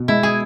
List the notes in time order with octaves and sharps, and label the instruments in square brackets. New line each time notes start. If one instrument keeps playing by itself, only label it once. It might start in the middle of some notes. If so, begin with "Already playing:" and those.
Already playing: [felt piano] B2
[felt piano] G#3 [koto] E4
[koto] G#4